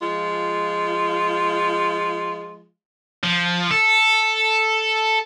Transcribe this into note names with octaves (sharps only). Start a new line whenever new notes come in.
F3 G#3 F4
F3
A4